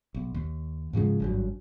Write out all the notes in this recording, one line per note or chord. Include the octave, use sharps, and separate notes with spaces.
B1
D#2
G#2 C#3 F3 G#3
G#1 G2 F#3